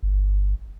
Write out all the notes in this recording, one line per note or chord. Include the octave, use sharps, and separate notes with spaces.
G1